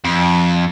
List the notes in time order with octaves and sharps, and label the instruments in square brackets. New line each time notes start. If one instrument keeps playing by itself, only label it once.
[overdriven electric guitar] F2